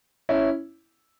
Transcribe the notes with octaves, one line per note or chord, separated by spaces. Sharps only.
C#4 E4